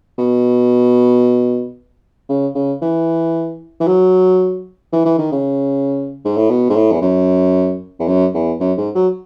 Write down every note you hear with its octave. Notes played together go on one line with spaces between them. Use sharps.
B2
C#3
C#3
E3
E3
F#3
E3
E3
D#3
C#3
G#2
A2
B2
G#2
A2
E2
F#2
E2
F#2
E2
F#2
G#2
F#3